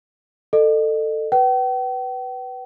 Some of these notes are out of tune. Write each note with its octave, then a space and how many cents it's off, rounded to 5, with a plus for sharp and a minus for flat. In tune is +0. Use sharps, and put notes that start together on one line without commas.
A4 +15 D#5 -35
B4 +0 G5 -45